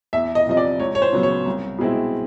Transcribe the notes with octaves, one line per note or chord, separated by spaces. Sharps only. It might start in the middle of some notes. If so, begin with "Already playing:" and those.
E2 E5
D#5
C3 F3 D#5
D5
C#2 C#5
C#5
C5
C#3 F#3 B3
C#5
C2
B2 G#3 C4 E4